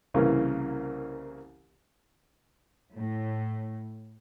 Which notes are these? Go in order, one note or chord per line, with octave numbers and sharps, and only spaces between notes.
C2 C#3 E3 A#3
A2